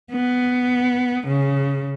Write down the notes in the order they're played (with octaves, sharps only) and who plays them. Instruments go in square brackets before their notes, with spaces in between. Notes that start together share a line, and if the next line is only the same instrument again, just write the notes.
[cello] B3
C#3